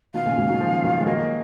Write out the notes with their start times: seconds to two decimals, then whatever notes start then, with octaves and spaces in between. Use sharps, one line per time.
0.14 B2 D#3 F5
0.26 A#2 C#3
0.38 G#2 B2
0.49 D#3 F#3
0.60 C#3 F3
0.84 D#3 F#3
1.00 G#3
1.07 F#3 A#3 D#5